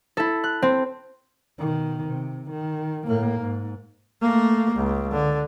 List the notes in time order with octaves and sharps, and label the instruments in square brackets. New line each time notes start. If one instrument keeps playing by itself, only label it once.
[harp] E4 A4
F#6
C4
[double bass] B2 D#3
C3
D#3
A2 A#3
G#2
A3 A#3
C#2
D3